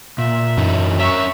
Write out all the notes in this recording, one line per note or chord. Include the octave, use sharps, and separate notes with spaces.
A#2 E5
F#2 E3 F#3 D#4
C#4 A#4 E5 C#6